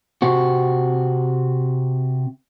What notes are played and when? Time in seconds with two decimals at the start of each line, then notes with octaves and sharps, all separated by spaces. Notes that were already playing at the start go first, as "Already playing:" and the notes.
0.22 C3 C4 F#4